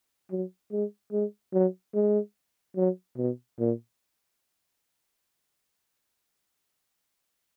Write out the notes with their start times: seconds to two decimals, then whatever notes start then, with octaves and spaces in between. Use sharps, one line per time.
0.31 F#3
0.72 G#3
1.12 G#3
1.53 F#3
1.94 G#3
2.76 F#3
3.17 B2
3.59 A#2